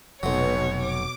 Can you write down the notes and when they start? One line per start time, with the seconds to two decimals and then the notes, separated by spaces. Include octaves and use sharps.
0.23 F1 B1 B2 F#3 C#5
0.76 D6